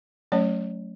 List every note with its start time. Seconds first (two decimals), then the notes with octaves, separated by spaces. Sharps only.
0.32 F#3 A3 C#4 C#5